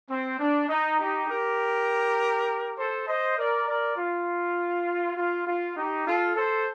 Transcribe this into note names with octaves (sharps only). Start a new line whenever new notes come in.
C4
D4
D#4
D#4 G4
G4 A#4
A4 C5
C5 D#5
A#4 D5
A#4 D5
F4
F4
F4
D#4 G4
F4 A4
A4 C5